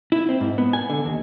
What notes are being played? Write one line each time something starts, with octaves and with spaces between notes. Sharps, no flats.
E4
C4
G#2
B3
G#5
D3
D#2